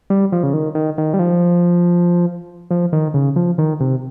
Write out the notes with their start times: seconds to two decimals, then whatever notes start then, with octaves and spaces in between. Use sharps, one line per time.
0.10 G3
0.32 F3
0.43 C#3
0.53 D#3
0.75 D#3
0.98 D#3
1.14 G3
1.19 F3
2.71 F3
2.93 D#3
3.14 C#3
3.36 F3
3.58 D#3
3.80 C3